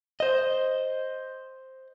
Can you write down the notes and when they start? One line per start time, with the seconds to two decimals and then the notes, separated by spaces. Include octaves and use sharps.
0.20 C5 D#5